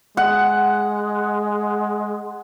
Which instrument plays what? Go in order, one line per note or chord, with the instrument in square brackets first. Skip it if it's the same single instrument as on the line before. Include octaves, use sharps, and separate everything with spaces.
[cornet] G#3 [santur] F#5